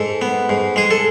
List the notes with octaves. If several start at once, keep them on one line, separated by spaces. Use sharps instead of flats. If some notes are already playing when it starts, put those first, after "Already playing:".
Already playing: G#2 A4
B3
G#2
G#3 G#4
A4